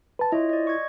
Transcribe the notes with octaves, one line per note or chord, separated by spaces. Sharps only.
B4 A5
E4 F4 C#5 D#5
D5 D#5
C#6 G#6